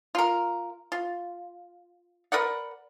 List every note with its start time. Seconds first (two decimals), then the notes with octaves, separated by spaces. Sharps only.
0.15 F4 A#4
0.92 F4
2.32 A#4 B4 D5 F#5